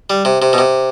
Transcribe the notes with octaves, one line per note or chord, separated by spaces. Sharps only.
G3
C3
C3
B2
C3